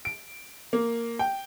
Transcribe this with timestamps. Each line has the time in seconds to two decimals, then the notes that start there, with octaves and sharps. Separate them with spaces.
0.05 D7
0.73 A#3
1.19 G5